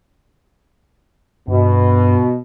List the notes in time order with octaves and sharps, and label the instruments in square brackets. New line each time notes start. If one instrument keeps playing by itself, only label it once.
[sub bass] G2 [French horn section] B2